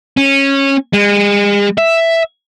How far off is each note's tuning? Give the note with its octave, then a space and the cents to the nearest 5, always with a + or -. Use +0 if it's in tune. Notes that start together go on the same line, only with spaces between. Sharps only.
C#4 -15
G#3 -40
E5 +5